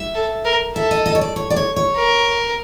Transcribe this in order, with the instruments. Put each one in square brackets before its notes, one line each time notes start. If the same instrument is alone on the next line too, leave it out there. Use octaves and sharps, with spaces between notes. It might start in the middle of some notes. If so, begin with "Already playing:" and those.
Already playing: [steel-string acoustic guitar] E5
[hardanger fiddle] A4
A#4
[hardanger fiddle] A4 [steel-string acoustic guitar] E5
[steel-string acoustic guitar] D#5
D#5
C#5
D5
C#5
D5
C#5
C#5
[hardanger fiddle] A#4